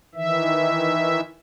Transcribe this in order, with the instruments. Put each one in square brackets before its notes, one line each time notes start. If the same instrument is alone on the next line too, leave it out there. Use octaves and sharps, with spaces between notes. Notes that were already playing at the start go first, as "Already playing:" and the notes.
[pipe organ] D#3 E3 E5